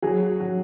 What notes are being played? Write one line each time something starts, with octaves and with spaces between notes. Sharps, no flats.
F#3 G#4
F#4
F#3